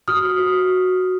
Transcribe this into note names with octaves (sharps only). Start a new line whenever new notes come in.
F#4 D#6 F6
F#4